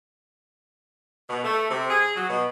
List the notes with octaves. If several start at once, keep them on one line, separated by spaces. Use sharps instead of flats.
B2
A3
C3
G#4
F#3
B2